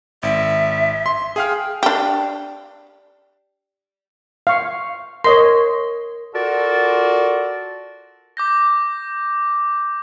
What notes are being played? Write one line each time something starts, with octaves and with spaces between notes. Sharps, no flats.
G#1 E5
C6
G#4 F5 G5 F6
D4 G4
F5 C#6
A#4 C#5 D#5 C6
F4 F#4 A4 A#4 D5
D6 G6 A#6